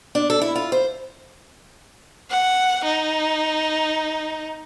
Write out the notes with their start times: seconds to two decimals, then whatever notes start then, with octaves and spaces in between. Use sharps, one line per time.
0.15 D4
0.30 A4
0.41 E4
0.55 F4
0.72 C5
2.30 F#5
2.84 D#4